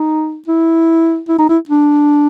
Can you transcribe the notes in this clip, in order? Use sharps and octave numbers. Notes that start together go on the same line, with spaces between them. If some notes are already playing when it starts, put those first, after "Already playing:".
Already playing: D#4
E4
E4
D#4
E4
D4